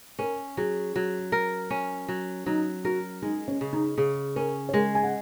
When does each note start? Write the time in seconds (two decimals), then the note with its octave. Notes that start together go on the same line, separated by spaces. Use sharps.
0.19 C#4 A#4
0.57 F#3 G#4
0.96 F#3
1.32 A#4
1.70 C#4
2.08 F#3
2.46 F#3 D#4
2.85 F#4 A#4
3.22 G#3 D#4
3.48 C#4
3.61 C#3
3.73 D#4
3.98 C#3 G#4
4.36 C#4 A#4
4.69 C#5
4.74 G#3 A#4
4.95 G#5
5.03 F#5